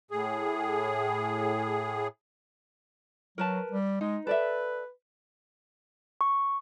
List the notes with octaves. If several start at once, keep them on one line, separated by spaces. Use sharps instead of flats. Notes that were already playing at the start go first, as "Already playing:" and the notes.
A2 G#4
F#3 A#4 B4 A5
G3
G#3 D#4
A4 B4 D5 E5
C#6